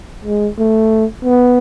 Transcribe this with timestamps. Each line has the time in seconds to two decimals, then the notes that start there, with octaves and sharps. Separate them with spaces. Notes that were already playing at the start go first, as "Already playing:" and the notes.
0.25 G#3
0.59 A3
1.25 B3